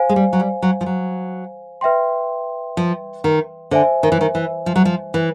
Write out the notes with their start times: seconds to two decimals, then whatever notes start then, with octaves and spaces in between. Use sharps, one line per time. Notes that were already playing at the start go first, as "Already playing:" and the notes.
Already playing: C5 F5 G#5
0.09 G#3
0.16 G3
0.33 F#3
0.40 G3
0.62 F#3
0.81 F3
0.86 F#3
1.81 B4 E5 G5 C6
2.77 F3
3.24 D#3
3.71 D3 C5 E5 G#5
4.03 D#3
4.12 E3
4.21 D#3
4.35 E3
4.66 F3
4.76 F#3
4.85 F3
5.14 E3